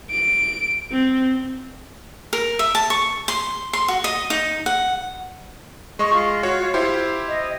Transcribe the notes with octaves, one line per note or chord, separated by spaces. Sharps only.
D7
C4
A#4
E5
A5
C#6
C6
C6
F#4
D#5
D#4
F#5
G#3 D#5 C#6
F4
F#4 C#5
E4 G4 C5
D#5